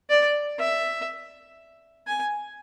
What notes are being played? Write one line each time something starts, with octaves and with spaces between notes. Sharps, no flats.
D5
E5
G#5